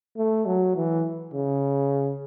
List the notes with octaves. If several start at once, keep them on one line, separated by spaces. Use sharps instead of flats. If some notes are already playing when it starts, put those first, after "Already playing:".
A3
F#3
E3
C#3